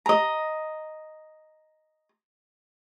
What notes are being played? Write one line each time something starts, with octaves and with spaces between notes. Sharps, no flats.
D#5 A#5